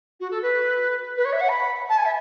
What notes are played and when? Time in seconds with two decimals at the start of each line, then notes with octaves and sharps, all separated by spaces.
0.20 F#4
0.31 A4
0.42 B4
1.17 B4
1.25 C#5
1.33 E5
1.41 F#5
1.49 B5
1.89 A5
1.98 G#5
2.05 E5